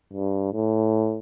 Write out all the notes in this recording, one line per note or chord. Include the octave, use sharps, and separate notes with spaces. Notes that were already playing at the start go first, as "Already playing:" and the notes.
G2
A2